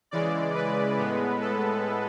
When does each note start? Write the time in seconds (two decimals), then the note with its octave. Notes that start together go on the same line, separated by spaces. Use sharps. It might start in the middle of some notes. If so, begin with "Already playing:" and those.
0.11 C#3 E3 G#3 D5
0.55 B4
0.98 A2 G#3 B3
1.41 A4